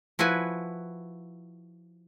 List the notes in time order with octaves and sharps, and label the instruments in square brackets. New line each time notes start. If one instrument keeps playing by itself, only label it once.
[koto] F3 E4 F#4 B4 G#5